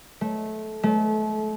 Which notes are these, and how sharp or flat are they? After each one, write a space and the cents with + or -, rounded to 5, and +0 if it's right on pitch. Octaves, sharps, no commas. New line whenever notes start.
A3 -20
A3 -35